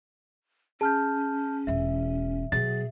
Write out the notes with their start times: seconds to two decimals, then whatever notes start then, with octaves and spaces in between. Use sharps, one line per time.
0.81 C#4 G#4 A5 F6 G6
1.67 E1 B2 E5
2.52 B2 F#3 G#4 A6